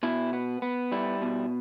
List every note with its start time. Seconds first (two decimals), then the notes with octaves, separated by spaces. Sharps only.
0.03 B2 E4
0.33 B3
0.62 B3
0.92 G3 E4
1.22 B2